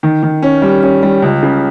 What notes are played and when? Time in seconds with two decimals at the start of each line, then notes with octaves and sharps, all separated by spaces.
0.03 D#3
0.23 D#3
0.42 C#4
0.62 G3
0.83 C#4
1.03 G3
1.22 C#2
1.43 C#3